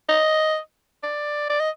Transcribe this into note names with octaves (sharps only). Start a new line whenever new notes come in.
D#5
D5
D5
D#5